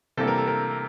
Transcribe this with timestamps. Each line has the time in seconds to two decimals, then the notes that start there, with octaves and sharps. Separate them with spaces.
0.17 C3 E3 G3 A#3 A4
0.28 A#4
0.38 A4
0.47 A#4